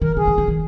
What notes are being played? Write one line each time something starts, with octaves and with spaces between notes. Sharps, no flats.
D#3 A#4
D3 G#4
D#3
D3
D#3